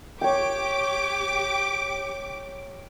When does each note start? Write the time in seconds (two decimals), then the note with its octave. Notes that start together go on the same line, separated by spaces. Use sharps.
0.21 G4 C#5 G5 D6